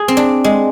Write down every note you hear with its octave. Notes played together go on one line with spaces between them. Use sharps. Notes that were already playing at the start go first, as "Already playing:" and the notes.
Already playing: G#4
C4
D4
G#3